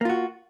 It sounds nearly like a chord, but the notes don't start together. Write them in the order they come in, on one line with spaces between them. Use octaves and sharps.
A#3 F4 F#4